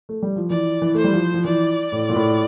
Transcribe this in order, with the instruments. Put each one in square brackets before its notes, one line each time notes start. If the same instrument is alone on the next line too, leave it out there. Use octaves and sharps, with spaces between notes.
[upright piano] A3
G3
F3
[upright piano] E3 [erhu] D5
[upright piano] E3
[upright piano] A3 [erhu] C5
[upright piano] G3
F3
F3
[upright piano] E3 [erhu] D5
[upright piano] A2
A#2
A2